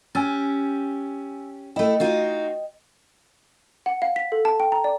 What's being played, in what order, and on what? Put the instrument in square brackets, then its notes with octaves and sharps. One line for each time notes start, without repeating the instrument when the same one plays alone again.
[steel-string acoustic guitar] C#4 G4 [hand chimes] G#5 E6 A6
[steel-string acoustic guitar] A3 E4 [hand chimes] D#5 G5
[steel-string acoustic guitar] D#4 F4 F#4
[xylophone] F#5
F5
B6
A4
A5
G5
A#5
D5